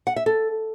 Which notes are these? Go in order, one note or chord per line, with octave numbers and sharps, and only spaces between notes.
F#5
E5
A4